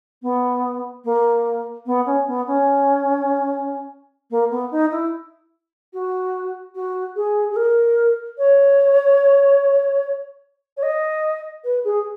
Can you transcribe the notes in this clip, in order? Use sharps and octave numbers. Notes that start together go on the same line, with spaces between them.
B3
A#3
B3
C#4
B3
C#4
A#3
B3
D#4
E4
F#4
F#4
G#4
G#4
A#4
C#5
C#5
D#5
B4
G#4